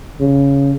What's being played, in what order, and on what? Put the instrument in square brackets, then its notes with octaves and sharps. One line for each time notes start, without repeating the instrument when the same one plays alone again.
[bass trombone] C#3